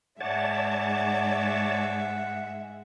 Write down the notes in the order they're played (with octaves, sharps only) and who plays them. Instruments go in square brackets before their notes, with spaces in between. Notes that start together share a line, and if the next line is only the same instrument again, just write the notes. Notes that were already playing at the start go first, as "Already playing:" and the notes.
[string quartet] G#2 G#3 E5 [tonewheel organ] C#5 D5 A5 [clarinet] F#5